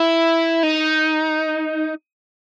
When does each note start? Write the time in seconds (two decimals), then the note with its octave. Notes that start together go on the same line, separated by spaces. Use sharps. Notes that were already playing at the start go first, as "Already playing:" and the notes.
Already playing: E4
0.63 D#4